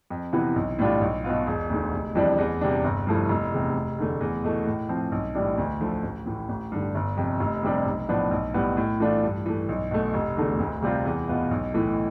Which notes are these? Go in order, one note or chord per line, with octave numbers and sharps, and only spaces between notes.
F2
C3 E3 B3 E4
B1
A2 G3 D4 F4
B1
B2 B3 F4
E1
D2 D3
F1
F2 E3 G3 D4
E2
C3 G3 D4
G1
G2 F3 A3 E4
F1
E2 C3
F1
E2 D3 A3
E2
B2 A3 E4
A2
F3 C4
B1
A2 E3 G3 D4
D2
D3 F3 A3
A1
A2 E3
A1
G2 D3
G1
F2 C3
F1
F2 C3 G3 D4
B1
A2 F3 B3 D4
B1
A2 G3 B3
A2
E3 A3 D4 F4
G2
E3 A3
B1
B2 A3
F1
E2 D3 A3
D2
C3 G3 C4 F4
E2
B2 B3 F4
B1
A2 E3 A3